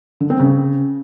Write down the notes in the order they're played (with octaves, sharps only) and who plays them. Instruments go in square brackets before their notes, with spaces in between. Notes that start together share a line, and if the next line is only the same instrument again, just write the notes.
[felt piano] D3
C4
C#3